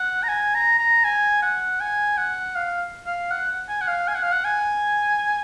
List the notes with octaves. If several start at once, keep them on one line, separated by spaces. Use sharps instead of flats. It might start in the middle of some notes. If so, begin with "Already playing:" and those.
Already playing: F#5
A#5
G#5
A#5
A#5
G#5
F#5
G#5
F#5
F5
F5
F#5
G#5
F#5
F5
G#5
F#5
F5
F#5
G#5